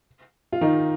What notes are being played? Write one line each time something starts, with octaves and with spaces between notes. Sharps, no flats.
F4
D#3 D#4